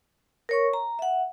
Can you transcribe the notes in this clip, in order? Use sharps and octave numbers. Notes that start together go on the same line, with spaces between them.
A#4 C#5 C#6
A#5
E5 F#5